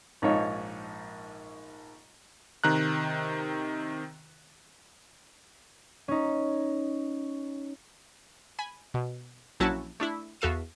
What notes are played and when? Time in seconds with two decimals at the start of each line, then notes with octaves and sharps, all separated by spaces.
0.22 A#1 G#2 F3 D#4 C#5
2.64 C3 D#3 A#5 F#6
6.08 C#4 D#4
8.59 G#5 B5
8.94 B2
9.60 A#1 F#3 C#4 E4 F#4 A5
10.00 A3 D4 E4
10.41 E2 F#4 A4 E5 F5 D#7